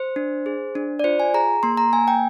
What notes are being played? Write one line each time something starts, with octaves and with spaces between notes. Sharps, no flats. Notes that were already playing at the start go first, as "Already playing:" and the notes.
Already playing: C5
D4
G#4
D4
D5
F4 C5
G#5
G#4 A#5
A#3 C6
A#5
A#3 G#5
G5